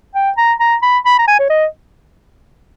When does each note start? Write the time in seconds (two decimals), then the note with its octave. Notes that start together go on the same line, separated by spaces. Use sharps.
0.15 G5
0.38 A#5
0.60 A#5
0.83 B5
1.06 B5
1.19 A#5
1.28 G#5
1.39 C#5
1.50 D#5